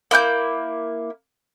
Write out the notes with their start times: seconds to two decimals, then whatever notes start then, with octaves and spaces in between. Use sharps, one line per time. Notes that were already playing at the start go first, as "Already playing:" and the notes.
0.11 A#3 E4 F#6 G6